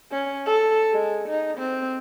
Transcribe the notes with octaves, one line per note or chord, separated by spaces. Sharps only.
C#4
A4
G#3
D#4
C4